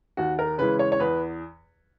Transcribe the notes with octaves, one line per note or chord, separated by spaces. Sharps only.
D#2 F#4
A#4
C#3 E3 G#3 B4
C#5
C#5
E2 B4